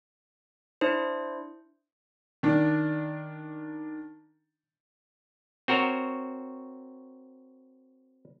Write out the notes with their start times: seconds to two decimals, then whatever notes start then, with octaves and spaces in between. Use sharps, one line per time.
0.81 D4 E4 C5
2.43 D#3 D4
5.68 C4 F#4 A#4 C#5